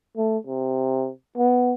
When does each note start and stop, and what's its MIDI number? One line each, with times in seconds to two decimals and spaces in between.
0.17 0.37 57
0.47 1.10 48
1.37 1.74 59